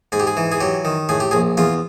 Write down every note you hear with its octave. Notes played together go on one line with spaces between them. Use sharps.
G#2 G#4
G4
G#4
E3
G#4
F#3 G4
D#3
A2 G#4
G4
A#1 G#4
E2 F4